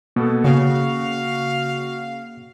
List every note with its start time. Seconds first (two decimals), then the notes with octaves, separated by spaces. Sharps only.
0.16 B2 A#3 B3 A4
0.44 C#3 F#4 F5